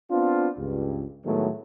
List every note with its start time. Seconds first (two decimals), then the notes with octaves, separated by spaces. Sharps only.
0.10 B3 C4 D4 F4
0.58 C#2 G2
1.25 A2 D#3 F#3 G#3 A3 B3